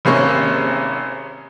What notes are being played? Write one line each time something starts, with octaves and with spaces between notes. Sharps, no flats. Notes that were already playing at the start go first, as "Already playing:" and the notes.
G#1 C3 A#3 C#4 C#6